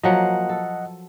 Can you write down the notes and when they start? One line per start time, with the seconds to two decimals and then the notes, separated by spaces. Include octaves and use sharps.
0.03 F3 F#3 A#3 D#5 F#5
0.49 A4